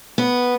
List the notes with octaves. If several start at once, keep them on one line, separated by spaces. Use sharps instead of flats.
B3